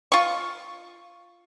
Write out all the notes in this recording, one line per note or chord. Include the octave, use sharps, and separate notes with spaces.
F4 C#6